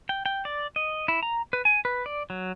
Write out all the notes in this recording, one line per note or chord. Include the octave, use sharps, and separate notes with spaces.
G5
G5
D5
D#5
E4
A#5
B4
G#5
B4
D5
F#3